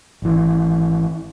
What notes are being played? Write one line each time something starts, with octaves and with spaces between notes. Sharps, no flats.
G#1 E3